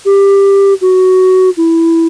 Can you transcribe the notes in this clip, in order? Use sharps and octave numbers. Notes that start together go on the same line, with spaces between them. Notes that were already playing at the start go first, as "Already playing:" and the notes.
G4
F#4
E4